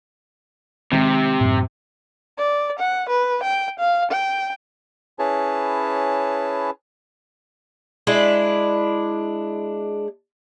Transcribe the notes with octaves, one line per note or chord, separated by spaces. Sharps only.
C3 D#3 G#3 C4
F#2 A2
D5
F#5
B4
G5
F5
G5
C#4 E4 G#4 B4 C#5 A5
G#3 D4 E4